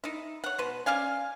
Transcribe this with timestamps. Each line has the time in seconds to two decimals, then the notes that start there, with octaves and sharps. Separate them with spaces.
0.04 D#4 E4
0.44 C#5 F#5
0.58 B2 B4 C5
0.86 C#4 D5 F5 G#5